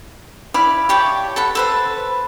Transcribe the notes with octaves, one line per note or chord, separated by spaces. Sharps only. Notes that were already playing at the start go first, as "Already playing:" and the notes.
E4 D5 F5 B5
G4 C#5 D5 A5
A4 F#5 B5
A4 B4 C5